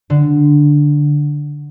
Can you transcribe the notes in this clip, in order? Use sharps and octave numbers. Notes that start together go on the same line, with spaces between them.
D3